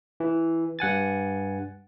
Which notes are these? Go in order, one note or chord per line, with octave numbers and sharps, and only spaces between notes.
E3
G2 F#5 G#5 A6